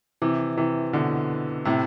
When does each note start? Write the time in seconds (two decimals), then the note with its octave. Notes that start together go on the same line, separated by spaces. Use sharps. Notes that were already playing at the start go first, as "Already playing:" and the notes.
0.22 C3 E3
0.58 C3 E3
0.93 B2 D3
1.65 A2 C3